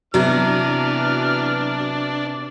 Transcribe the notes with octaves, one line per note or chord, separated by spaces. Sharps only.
C3 E3 F#3 B3 D4 F6